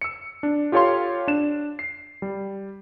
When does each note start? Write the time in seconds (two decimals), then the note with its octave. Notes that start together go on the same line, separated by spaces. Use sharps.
0.01 E6 C#7
0.43 D4
0.72 F4 G4 A4 C#5 F5 C6
1.28 D4 E7
1.79 C7
2.22 G3